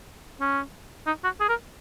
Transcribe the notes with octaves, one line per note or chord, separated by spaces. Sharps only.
C#4
D#4
F#4
G#4
A#4